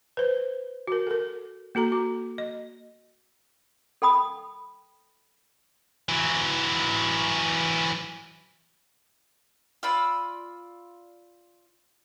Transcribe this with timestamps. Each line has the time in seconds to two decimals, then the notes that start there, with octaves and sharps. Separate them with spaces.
0.17 B4 C5
0.87 F#4 A#4
1.07 A4 A#4
1.75 A#3 F#4 A4 A#5
1.92 F#4
2.38 D#5
4.02 A4 G5 B5 D#6
6.08 E3 F#3
9.83 F4 D5 B5 E6